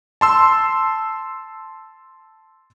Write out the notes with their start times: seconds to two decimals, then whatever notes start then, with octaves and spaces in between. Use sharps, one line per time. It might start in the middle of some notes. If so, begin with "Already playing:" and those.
0.21 A5 C6 E6